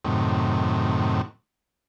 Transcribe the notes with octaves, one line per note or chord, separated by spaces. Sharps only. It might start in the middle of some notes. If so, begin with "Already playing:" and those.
F#2 A2 C3 D#3